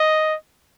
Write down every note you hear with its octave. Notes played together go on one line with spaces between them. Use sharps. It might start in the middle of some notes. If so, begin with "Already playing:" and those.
Already playing: D#5